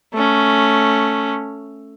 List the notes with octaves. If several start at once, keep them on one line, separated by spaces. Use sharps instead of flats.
A3 C#4